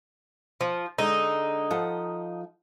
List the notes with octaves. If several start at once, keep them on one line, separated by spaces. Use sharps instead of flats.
F3
D3 G#3 D#4
F3 A4 F#5